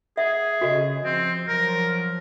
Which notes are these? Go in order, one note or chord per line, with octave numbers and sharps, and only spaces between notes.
G#4 E5 F#5
C#3 F#4 A4 D#5
F3 C4
F3 F#3 A#4